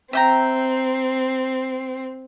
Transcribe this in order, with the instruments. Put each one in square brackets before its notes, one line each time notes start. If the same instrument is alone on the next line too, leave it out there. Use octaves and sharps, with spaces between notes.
[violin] C4 [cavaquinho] E5 G5 A#5